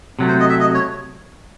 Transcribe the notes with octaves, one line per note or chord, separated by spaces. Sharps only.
C3 F#3 A3
C5
D#5
E5
D#5
C#5